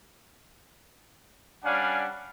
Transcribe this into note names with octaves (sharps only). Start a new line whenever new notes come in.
G3 C#4 D4 F5 F#5 G#5